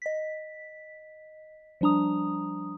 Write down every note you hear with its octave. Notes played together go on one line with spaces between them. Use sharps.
D#5 B6
F3 G3 D4 A#5 D#6